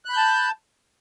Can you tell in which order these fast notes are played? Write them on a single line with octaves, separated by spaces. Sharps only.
F#6 B5 G6 A5